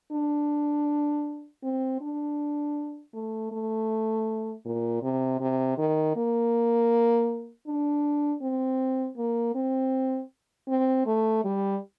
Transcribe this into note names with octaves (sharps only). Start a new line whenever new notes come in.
D4
C4
D4
A3
A3
A#2
C3
C3
D#3
A#3
D4
C4
A#3
C4
C4
A3
G3